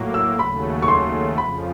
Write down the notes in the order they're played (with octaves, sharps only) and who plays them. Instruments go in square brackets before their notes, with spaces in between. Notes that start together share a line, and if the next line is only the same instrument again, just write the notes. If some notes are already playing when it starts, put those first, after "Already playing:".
Already playing: [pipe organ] A2 F#3 A#3
[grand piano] E6
[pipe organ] D#2 C#3 F#3 A3 [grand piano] B5
[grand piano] C#6
C6
[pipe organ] F2 C#3 F3 [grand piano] B5